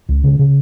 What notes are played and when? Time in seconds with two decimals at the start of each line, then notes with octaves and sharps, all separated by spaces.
0.09 C#2
0.24 C#3
0.39 C#3